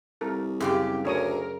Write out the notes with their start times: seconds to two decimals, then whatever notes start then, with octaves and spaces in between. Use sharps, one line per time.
0.21 C2 A4 A#4
0.60 F#2 C#3 F4 G4 G#4
1.05 D2 G#4 A#4 C#5 D#6